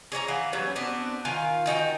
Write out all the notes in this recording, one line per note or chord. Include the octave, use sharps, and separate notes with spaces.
G#4 C#5 D5 A#5
E3 F5 F#5
F#3 G3 B3 C#4
B3 C4 D4 F#4
D#3 F4 F5 G#5
D#3 D#4 F#4 G5